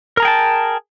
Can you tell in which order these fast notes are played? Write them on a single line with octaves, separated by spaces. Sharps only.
A#4 A#5 G#4 G5 A5